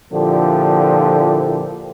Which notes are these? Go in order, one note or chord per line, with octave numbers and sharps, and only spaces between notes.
A#2 D3 F3 E4 G4 A4